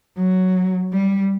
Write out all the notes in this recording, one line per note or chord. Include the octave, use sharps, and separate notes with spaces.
F#3
G3